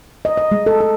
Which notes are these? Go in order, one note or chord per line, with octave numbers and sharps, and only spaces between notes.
D#5
D#5
G#3
A4
A4